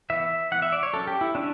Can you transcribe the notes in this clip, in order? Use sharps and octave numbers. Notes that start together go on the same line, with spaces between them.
E3 B3 E5
E3 B3 F#5
E5
D5
C#5
F#3 C#4 A4
G4
E4
F#3 C#4 D4